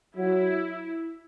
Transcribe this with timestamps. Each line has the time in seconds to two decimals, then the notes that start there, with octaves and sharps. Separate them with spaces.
0.16 F#3 E4